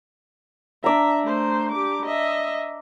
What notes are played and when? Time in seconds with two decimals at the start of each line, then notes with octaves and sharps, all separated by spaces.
0.84 D4 D5 E5 A#5
1.24 A3 C5
1.72 G4 D6
2.06 D#5 E5